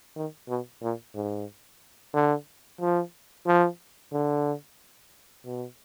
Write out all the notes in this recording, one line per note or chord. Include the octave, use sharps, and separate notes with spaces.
D#3
B2
A#2
G#2
D3
F3
F3
D3
B2